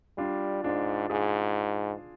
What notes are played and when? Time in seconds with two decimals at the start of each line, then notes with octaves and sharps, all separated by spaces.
0.17 G3 D4 F4
0.63 G#2 D4 F4
1.10 G#2 F4 G#4